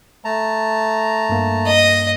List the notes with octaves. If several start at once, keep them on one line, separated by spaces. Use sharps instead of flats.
A3 A5 A#5
G2 A#3
D#5